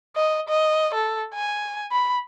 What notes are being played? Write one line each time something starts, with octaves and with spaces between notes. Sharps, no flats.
D#5
D#5
A4
G#5
B5